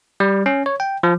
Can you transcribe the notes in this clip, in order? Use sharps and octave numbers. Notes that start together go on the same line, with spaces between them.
G3
C#4
C#5
G5
F3